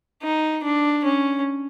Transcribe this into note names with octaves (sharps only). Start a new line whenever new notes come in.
D#4
D4
C#4